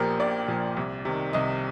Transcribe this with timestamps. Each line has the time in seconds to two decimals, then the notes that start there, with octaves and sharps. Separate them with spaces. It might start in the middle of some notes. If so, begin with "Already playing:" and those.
Already playing: A#1 A#2 F3 G4 A#4
0.19 A#1 D5
0.48 A#2 F3
0.77 C2
1.05 C3 D#3
1.33 C2 D#5